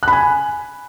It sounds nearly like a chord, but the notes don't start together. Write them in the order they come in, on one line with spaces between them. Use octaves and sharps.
F#6 B5 G#5